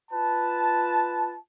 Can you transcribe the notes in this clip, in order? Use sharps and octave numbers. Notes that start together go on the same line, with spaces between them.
F4 B4 A5